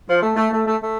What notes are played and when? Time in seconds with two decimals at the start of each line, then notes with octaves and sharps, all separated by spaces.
0.08 F3
0.22 A3
0.36 A3
0.50 A3
0.65 A3
0.79 A3